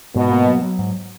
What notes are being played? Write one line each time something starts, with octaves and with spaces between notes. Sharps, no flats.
G#2 B2
A#3
F#3
F#3
G#2